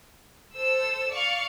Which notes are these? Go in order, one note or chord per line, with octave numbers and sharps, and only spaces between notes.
A4 C5 E6
D5 F5 C#6